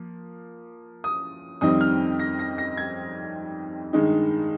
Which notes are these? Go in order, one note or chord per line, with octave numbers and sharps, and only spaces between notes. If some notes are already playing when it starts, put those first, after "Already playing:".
Already playing: F3 A#3
D#6
F2 D#3 G3 C4 D#4 D#6
F6
A#6
A#6
A#6
G#6
G2 D#3 G#3 D#4